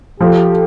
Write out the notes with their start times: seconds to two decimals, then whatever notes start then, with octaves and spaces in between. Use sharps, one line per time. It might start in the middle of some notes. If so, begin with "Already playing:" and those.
0.21 F3 G4 A4